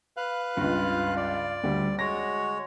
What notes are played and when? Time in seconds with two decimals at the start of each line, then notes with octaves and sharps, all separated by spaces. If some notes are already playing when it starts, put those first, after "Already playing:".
0.17 B4 F5 F#6
0.57 C#2 G2 F4
1.17 D5
1.63 D2 G3
1.99 G#3 F#4 C#5 A#6